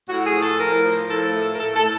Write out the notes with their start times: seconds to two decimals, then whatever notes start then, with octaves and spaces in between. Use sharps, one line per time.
0.09 A2 F#4
0.26 G#4
0.34 F3
0.42 A4
0.59 A2 A#4
0.84 F3
1.08 A2 A4
1.34 A3
1.54 A#4
1.58 A2 A4
1.75 A4
1.83 A2